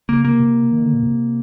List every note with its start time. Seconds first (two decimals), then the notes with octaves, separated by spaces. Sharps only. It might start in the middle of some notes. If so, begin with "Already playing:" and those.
0.09 C#3 A#3
0.25 C3 A#3
0.40 C3
0.72 D#3
0.82 D3
0.93 B2
1.03 C3